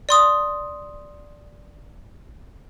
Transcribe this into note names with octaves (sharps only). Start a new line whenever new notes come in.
D5 C6 D#6